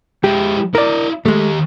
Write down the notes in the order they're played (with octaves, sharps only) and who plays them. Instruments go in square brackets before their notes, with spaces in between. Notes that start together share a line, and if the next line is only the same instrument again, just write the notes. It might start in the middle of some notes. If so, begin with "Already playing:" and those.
[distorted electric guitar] G#3 E4 [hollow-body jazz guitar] G4
[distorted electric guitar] E4 D#5 [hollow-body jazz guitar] A#4 D5
[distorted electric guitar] D#3 G4 [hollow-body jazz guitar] G#3 A3